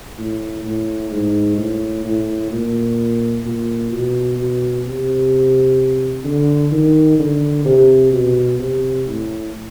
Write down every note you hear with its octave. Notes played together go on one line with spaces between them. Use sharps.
A2
A2
G#2
A2
A2
A#2
A#2
B2
B2
C3
D3
D#3
D3
C3
B2
C3
A2